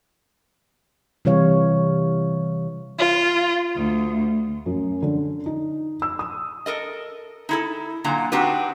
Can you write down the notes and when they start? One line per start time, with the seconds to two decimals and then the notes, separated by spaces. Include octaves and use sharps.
1.25 C3 E3 G3 C#5 F5
2.98 F4
3.75 D2
4.66 F#2
5.03 D3
5.46 D#4
6.02 E6
6.19 D#6
6.66 A4 A#4 D#5
7.49 D#4 E4 A4
8.04 A#2 D3 F#3 A#5
8.32 C4 D4 D#4 F#4 G4 B4